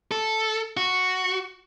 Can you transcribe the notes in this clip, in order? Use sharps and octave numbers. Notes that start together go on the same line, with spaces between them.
A4
F#4